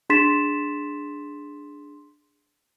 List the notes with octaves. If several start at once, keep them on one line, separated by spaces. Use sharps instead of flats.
D4 G#4 C6 A6 B6 E7